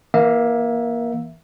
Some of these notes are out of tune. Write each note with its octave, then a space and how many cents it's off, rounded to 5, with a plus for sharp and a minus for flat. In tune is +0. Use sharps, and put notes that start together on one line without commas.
E3 -5 A#3 +20 E5 +0